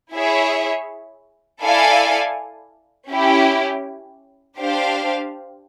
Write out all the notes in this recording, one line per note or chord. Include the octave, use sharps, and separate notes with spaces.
E4 G#4 C#5 E5
E4 A4 D5 F5 G#5
C#4 E4 G4
D4 G4 C5 F5